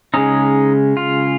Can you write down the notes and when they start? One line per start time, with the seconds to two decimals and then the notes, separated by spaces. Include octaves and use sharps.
0.14 C#3 G#3 C#4 D#4
0.97 F4